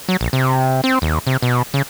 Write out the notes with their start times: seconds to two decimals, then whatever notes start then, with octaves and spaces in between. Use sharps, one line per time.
0.09 F#3
0.21 A#1
0.33 C3
0.84 C4
1.02 D#2
1.27 C3
1.42 B2
1.74 C#3